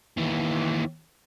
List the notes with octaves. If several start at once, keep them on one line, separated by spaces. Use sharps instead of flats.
D#2 E3